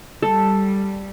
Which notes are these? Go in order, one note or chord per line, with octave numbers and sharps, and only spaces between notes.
G3 A4